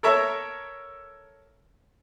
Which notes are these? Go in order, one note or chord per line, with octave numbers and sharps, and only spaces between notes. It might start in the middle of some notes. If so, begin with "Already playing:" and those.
A4 A#4 C#5 E5